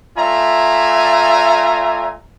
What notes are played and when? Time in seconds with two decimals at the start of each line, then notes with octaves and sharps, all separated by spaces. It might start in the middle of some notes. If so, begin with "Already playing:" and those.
0.17 A3 F4 D5 E5 G#5 A#5